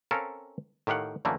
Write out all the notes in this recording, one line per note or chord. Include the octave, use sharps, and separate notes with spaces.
C4 C#4 A4 A#4 F5
A2 D#3 G4 F5 F#5
F#2 D3 E3 A3 A#3